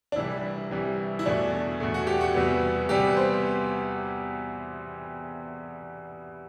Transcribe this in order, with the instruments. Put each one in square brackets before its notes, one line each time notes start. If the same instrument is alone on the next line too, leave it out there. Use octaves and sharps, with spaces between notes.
[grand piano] D4
C2 C3 E3 G3 E4
C2 C3 E3 G3
E4
E2 B2 A3 D4
E2 B2 A3
F#4
G4
F#4
E2 C3 G3 B3
E2 C3 G3 B3 G4
C5